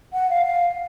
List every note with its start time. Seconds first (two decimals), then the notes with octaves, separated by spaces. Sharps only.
0.13 F#5
0.30 F5
0.46 F5